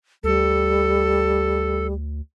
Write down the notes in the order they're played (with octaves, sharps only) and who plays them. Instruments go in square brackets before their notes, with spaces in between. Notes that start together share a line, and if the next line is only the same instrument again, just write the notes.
[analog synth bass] D2 [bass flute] G3 [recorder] A4